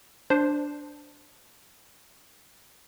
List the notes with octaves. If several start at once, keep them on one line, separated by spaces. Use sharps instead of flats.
D4 C5